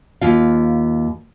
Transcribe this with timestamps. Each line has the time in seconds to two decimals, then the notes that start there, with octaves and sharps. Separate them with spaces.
0.21 D#2 F4 F5